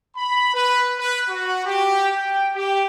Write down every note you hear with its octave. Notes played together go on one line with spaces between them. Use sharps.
B5
B4
B4
F#4
G4
G5
G4